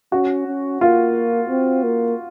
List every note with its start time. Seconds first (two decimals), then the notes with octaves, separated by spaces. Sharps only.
0.12 C#4 F#4
0.46 C#4
0.81 A#3 F4
1.49 C4
1.83 A#3